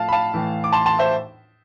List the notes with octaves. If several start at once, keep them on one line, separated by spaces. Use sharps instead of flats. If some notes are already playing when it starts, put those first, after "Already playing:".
Already playing: A2 F3 F5 A5
B5
F5 A5
A2 E3
D6
A5 C6
A5 C6
C5 E5